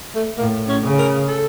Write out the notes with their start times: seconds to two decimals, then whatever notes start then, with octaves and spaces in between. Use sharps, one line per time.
0.15 A3
0.38 A2 A#3
0.69 C#4
0.83 C#3
0.99 A#4
1.28 A4